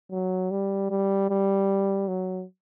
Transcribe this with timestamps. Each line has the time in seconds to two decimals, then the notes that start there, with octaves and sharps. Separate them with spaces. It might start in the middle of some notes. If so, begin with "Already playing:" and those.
0.11 F#3
0.51 G3
0.90 G3
1.30 G3
2.08 F#3